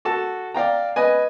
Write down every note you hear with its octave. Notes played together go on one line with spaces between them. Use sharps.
F#4 A4 A5
D5 F5 G5 A#5
B4 D#5 G#5